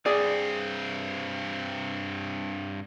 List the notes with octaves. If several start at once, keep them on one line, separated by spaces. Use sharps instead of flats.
G2 C4 G#4 D5